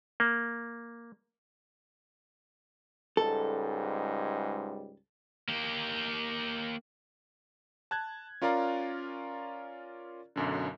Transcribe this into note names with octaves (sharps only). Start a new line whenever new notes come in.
A#3
C#2 G#2 G3 A4
A#3 G4
A5 F#6 G#6
C#4 F4 A#4 D5 F5 A#5
B1 F#2 D3